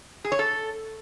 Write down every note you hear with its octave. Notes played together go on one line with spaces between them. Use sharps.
G#4
C#5
A4